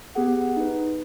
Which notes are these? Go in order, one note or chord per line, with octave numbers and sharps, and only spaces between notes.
B3 G4 G#4 F#5
D#4 B4